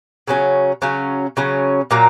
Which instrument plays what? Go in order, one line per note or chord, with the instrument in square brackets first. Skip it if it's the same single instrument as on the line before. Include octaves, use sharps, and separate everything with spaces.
[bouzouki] C#3 F#3 C#4
C#3 F#3 C#4
C#3 F#3 C#4
A#2 F#3 A#3